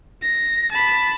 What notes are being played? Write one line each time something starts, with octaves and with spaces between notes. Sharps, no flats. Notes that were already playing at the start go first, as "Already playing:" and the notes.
A#6
A5 B5